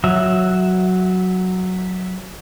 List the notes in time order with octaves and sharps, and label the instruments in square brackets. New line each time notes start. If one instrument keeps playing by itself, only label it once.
[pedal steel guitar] F#3 E5